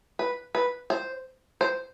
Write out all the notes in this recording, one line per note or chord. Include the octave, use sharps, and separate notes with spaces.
B4
B4
C5
C5